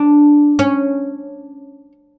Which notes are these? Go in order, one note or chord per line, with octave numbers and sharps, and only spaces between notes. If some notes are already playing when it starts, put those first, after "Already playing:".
Already playing: D4
C#4